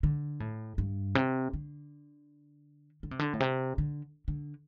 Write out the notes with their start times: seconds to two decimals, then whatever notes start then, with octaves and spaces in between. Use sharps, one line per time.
0.03 D3
0.40 A2
0.78 G2
1.15 C3
1.53 D3
3.03 D3
3.11 C3
3.19 D3
3.33 A2
3.40 C3
3.78 D3
4.28 D3